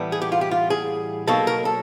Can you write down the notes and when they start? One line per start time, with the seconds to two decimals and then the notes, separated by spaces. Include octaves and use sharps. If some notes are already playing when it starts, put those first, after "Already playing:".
Already playing: A2 E3 G3 B3
0.12 G#4
0.22 G4
0.32 F4
0.41 G4
0.51 F4
0.70 G#4
1.27 B2 F#3 A#3 D#4 A4
1.47 A#4
1.65 A4